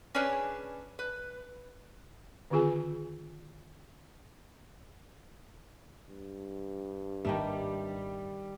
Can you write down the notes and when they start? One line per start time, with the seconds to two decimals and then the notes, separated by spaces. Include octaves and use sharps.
0.14 C#4 D4 G#4 B4 C#5
0.99 B4
2.50 D3 D#3 C4 F4 G#4 G#5
6.09 G2
7.25 G#1 G#2 D#3 G3 A#3 D4 E5